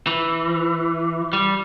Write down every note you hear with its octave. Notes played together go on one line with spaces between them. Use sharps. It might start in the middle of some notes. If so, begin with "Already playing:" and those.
E3
G3